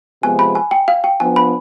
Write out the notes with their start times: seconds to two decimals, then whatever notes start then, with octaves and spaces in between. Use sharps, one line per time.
0.23 C3 F3 G#3 B3 G#5
0.39 B5
0.55 G#5
0.71 G5
0.88 F5
1.04 G5
1.20 F3 B3 D4 G#5
1.36 B5